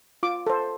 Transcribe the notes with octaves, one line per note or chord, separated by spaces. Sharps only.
F4 D6
A4 C5